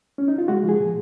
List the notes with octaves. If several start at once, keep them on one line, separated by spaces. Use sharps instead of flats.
C#4
D#4
F4
G#3 F#4
F3 G#4
A#2